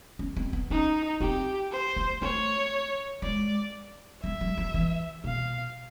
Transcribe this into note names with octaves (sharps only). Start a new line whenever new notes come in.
C#4
C4
B3
C#4 D#4
C4 G4
C5
A#3
A3 C#5
G#3 D5
G3 E5
F#3
F3
E3
B2 F5